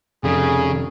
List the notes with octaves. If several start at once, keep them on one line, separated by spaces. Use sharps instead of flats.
F1 C#3 G#4